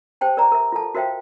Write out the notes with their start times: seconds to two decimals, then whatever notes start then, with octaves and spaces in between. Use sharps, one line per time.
0.21 G4 C5 G5 A5
0.37 A#4 D5 A#5
0.52 A#4 E5
0.72 F4 A4 A5
0.95 F#4 A#4 C5 E5 F5 G5